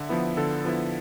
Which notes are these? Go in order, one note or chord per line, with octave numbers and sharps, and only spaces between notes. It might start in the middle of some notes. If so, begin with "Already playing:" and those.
Already playing: D3 E5
F3 B3 E4
D3 A4
F3 B3 E4